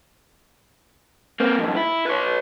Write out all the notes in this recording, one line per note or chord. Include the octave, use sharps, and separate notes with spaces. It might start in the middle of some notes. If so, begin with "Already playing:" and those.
A#3 C4
F2 G#2
E4
B4 C#5